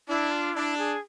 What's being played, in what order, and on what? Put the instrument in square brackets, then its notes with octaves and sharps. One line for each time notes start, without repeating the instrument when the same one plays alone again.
[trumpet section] D4 [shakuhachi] E4
[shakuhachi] F4
[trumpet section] D4 [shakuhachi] E4
[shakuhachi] G#4